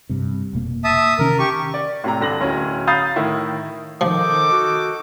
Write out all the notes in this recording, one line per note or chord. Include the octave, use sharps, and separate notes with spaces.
G2 C3
F1 B2 A#3
E5 A5 D#6
C3 D#3 C#4 A#4
G4 C#6
D5
A2 C3 A#5
G2 D3 A#6 F#7
D1 C#4
F5 A#5 B5 D#6 G6 A6
A2 D#3 E4
D#3 F3 D#4 A4 D6
F#4